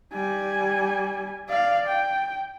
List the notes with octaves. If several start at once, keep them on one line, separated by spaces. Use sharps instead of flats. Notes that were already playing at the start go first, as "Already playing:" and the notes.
G3 G#5
D5 F5
G5